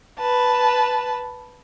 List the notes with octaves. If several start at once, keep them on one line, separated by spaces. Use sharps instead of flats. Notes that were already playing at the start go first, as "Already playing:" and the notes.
B4 A5